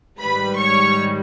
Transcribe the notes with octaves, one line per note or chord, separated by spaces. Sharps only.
G#2 D#3 G3 B4 B5
C#5 C#6